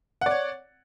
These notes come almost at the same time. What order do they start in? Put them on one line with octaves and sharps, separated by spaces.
F#5 D5 C#5